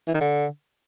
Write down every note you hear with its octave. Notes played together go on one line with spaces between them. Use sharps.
E3
D#3
D3